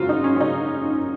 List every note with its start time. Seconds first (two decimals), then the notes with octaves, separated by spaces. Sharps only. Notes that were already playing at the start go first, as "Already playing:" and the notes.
Already playing: G#1 F#2 C#3 F4 F#4
0.09 D#4
0.24 C#4
0.36 C#4
0.41 C#3 D#4